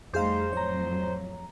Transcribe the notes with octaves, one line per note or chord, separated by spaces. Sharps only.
F2 G3 A3 D#4 G#4 C5 F5
F2 A2 F#3 C#5 A#5